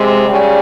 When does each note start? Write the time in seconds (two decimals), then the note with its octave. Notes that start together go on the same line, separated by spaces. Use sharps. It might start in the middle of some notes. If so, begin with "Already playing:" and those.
Already playing: C3 G#3
0.29 C#3 G3